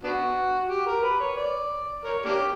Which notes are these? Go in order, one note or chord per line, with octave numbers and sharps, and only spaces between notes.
B3 D4 F#4
G4
A#4
B4
C#5
D5
A#4 C#5
A#3 D4 G4